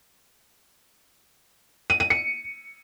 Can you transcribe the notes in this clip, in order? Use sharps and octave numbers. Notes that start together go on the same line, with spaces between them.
D#7
D#7
C#7